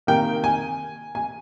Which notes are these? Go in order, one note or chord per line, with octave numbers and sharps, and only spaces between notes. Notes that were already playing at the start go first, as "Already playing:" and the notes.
C3 D#3 A#3 G5
G#5
G#5